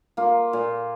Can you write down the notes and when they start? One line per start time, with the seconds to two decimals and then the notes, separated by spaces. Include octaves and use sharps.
0.17 A#3 F4
0.53 A#2